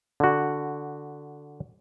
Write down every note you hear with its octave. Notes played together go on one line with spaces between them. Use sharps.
D3 F#4